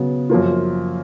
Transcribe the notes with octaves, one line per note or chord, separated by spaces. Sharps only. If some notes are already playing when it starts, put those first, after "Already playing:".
Already playing: C#3 F#3 B3
F#2 F3 A#3 F4